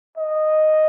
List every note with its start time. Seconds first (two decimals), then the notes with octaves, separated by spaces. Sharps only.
0.17 D#5